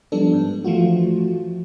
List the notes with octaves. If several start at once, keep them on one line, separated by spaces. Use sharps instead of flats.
F3 G3 B3 D4 A4
G#2 B3
E3 F3 A3 F4 F#4